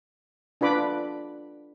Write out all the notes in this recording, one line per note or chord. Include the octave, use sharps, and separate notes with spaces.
D4 F4 B4 B5 D6